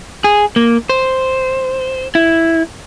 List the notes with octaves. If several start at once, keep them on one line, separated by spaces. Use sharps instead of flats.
G#4
A#3
C5
E4